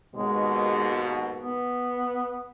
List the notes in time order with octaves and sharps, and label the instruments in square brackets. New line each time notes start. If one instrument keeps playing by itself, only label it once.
[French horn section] D#2 G#2 B2 [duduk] G#3
[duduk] B3